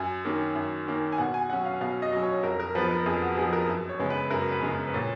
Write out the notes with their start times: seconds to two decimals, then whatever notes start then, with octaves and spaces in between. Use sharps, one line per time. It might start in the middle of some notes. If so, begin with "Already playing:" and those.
Already playing: F#2 G#5
0.25 D#3 A#3 C#4
0.55 F#2
0.88 D#3 A#3 C#4
1.12 G#5
1.18 B2 F#5
1.34 G#5
1.50 F#3 C#4 F#5
1.65 F5
1.81 B2 F5
2.02 D#5
2.12 F#3 C#4
2.23 C#5
2.43 F2 A#4
2.60 A#4
2.75 F3 B3 B4
2.91 A#4
3.06 F2 G#4
3.22 F#4
3.37 F3 B3 G#4
3.53 A#4
3.69 F#2
3.89 C#5
3.99 C#3 G#3 B3
4.10 B4
4.30 F#2 A#4
4.52 B4
4.63 C#3 G#3 B3
4.87 B4
4.94 A#2 C#5